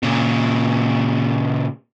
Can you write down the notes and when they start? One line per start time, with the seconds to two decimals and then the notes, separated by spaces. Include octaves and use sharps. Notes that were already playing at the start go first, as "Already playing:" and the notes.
0.03 A#2 C#3